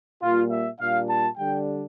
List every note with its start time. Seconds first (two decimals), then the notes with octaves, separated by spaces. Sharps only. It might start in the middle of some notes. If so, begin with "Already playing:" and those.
0.22 A#2 G3 A#3 F4
0.51 E5
0.80 A#2 G3 D4 F5
1.10 A5
1.37 D3 G3 D4 G5